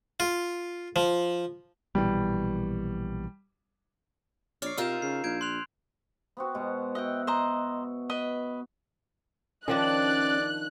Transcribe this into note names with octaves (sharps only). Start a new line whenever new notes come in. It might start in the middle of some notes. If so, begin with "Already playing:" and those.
F4
F3
A#1 B2 E3 G3
A#1 C#5 D5 F6 C7
C3 D#4 F4 A#4 E6 G6 E7
C#3 C7
A#1 G6 G#6 D7
C6 F#6 F7
B3 C4 F#4
B2 G#3 F#5
F#4 D#5 E5 F#5 G5
C5 D#5 A#5
B4 D#5
D#3 F3 C#4 D4 D5 F#6